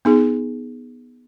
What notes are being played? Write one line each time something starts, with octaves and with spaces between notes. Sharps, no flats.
B3 D#4 G#4